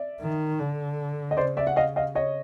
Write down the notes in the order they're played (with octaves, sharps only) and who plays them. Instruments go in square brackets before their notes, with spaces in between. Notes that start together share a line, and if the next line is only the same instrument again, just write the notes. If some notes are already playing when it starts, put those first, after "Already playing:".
Already playing: [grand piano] D5 E5
[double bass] D#3
D3
[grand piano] D#5
[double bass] C#3 [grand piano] C5 D5
[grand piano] D5 E5
F#5
D#5 F5
D#5 F5
C#5 D#5